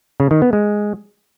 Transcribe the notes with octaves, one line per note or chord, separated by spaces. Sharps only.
C#3
D#3
B3
G#3